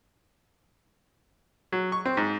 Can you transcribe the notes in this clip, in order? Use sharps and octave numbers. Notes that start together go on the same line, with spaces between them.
F#3
C#6
C4
G#2